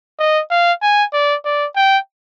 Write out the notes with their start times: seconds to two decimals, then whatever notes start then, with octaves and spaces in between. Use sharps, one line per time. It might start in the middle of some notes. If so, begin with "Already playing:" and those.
0.19 D#5
0.51 F5
0.82 G#5
1.13 D5
1.45 D5
1.76 G5